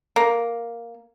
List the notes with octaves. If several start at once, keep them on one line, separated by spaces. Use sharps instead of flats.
A#3